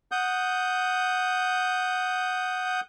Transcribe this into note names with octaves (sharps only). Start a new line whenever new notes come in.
F#5 D#6 G6